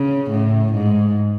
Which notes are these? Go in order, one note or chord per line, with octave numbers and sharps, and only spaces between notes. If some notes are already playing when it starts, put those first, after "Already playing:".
Already playing: C#3
A2
G#2